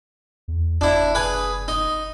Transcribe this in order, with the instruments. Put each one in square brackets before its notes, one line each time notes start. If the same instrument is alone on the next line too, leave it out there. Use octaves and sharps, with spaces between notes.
[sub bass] E2
[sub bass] F#1 [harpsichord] D4 E4
[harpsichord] G#4 B4
D#4